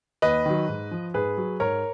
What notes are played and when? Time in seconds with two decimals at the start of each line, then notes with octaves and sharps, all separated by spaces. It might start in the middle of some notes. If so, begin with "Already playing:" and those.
0.22 D#2 B4 D#5
0.46 D#3 F#3
0.69 G#2
0.91 F3
1.14 G#2 G#4 B4
1.38 F#3
1.60 G#2 A#4 C#5